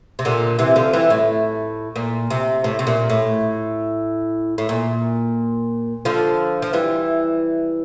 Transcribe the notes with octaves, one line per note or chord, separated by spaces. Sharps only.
C3
A#2 D3
C3 E3
D3 F3
E3 G3
A2
A#2
C3
A2
C3
A#2
A2
A2
A#2
D3 F3
F3
E3 G3